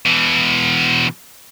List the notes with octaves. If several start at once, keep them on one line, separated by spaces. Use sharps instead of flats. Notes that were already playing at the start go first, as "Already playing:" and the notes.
B2 E3